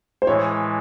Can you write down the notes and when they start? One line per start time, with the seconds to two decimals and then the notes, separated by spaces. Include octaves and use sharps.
0.22 C5
0.27 A2 E3 G#3 C#5